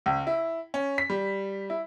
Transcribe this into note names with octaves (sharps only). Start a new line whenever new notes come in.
C#2
E4
C#4
B6
G3
E4